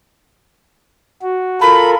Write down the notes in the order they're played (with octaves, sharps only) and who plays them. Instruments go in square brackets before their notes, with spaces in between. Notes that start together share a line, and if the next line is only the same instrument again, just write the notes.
[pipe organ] F#4
[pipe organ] F4 A4 A#4 [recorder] B5